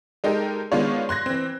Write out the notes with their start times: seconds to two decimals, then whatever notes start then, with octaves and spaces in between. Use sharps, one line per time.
0.24 G#3 D#4 G4 A4 A#4
0.72 D#3 G#3 B3 D4 F4 C#5
1.09 C6 F#6 G#6 A#6
1.26 E3 C4